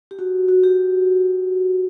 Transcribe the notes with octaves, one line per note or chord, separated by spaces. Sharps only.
G4
F#4
F#4
G4